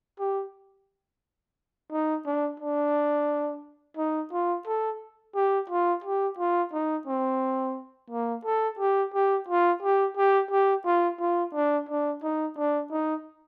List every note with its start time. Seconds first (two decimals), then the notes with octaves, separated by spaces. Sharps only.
0.20 G4
1.92 D#4
2.26 D4
2.60 D4
3.97 D#4
4.32 F4
4.66 A4
5.35 G4
5.70 F4
6.04 G4
6.38 F4
6.73 D#4
7.07 C4
8.10 A#3
8.45 A4
8.79 G4
9.14 G4
9.48 F4
9.82 G4
10.17 G4
10.51 G4
10.85 F4
11.20 F4
11.54 D4
11.89 D4
12.23 D#4
12.57 D4
12.91 D#4